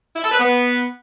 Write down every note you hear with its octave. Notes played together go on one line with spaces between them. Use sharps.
E4
A4
B4
B3